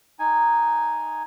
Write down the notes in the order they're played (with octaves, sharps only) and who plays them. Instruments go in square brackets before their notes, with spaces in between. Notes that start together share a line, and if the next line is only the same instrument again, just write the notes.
[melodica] D#4 G#5